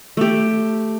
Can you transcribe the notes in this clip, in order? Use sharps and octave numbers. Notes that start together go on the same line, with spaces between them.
A3 G4